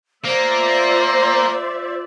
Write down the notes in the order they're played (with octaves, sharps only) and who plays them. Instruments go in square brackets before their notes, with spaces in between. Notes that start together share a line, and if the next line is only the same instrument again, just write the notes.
[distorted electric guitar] A#3 [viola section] F4 D5 E5 [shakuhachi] C5